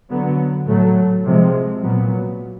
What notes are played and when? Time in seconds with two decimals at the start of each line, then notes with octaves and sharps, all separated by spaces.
0.10 D3 F#3 B3
0.67 A2 F#3 A3
1.25 C3 F3 G#3
1.83 A#2 F#3 B3